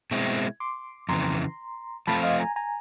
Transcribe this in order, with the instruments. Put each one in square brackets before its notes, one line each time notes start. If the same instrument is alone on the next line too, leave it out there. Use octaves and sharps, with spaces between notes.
[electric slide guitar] B2 G#3 C4 E4
[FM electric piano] C6 D6
[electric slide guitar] F2 C#3 E3 [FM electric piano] A#5 C6
[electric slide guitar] F3 A3 C4 F4 [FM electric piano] A5 B5
[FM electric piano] D#5 F5
G#5 A#5
G#5 A#5